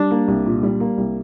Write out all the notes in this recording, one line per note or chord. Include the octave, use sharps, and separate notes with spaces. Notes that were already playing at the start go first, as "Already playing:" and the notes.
Already playing: G3 D4
A#3
C2
A#2
G3
A#3
C2